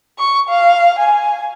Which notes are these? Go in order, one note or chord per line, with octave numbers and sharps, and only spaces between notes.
C#6
F5
G#5